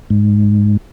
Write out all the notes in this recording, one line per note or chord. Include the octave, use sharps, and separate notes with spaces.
G#2